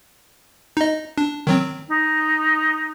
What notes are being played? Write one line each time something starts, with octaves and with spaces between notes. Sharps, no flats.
D#4 D#5
D4
D#3 F#3 C4
D#4